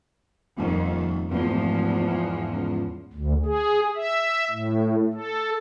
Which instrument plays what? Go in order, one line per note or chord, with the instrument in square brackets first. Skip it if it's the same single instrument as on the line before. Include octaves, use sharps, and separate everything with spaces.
[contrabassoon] D#1 [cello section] F2 D#3
[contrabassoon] D1 [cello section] E2 G#2 F3
[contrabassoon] C#2
[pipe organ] D2
G#4
E5
A2
A4